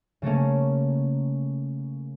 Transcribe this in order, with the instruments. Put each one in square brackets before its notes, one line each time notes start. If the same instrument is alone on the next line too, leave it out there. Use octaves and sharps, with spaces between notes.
[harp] C#3 A3 A#3 C#4